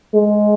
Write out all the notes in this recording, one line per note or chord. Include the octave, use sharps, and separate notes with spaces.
G#3